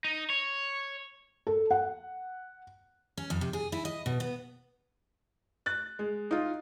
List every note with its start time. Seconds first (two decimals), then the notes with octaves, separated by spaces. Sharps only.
0.04 D#4
0.30 C#5
1.47 A4
1.71 F#5
3.17 C#4
3.30 F2
3.41 C3
3.53 G#4
3.72 E4
3.85 D#5
4.06 B2
4.20 B3
5.66 F#6 A6
5.99 G#3
6.31 D#4 F4